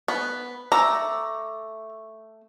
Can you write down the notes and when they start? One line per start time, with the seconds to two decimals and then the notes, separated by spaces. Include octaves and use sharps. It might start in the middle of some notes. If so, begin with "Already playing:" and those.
0.08 B3
0.72 A3 A#5 D6 E6